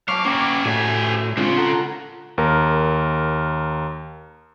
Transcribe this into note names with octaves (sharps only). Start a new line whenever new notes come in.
F#3 F5 A5 C#6 D6
A#3 C#4 E4 G5
A2 F#4 G4 D5 G#5
C#2 C#3 G#3 C4 D4 F4
A4 F#5 A#5
D#2 A#4